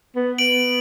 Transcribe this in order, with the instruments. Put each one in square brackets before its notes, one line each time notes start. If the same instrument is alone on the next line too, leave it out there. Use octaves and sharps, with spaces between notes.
[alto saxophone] B3
[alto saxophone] B3 [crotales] D7 F#7